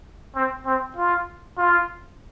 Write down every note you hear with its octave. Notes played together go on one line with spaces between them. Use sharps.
C4
C4
F4
F4